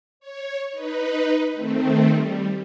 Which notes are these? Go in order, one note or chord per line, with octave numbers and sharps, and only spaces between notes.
C#5
D#4 B4
D#3 A3 C4
G3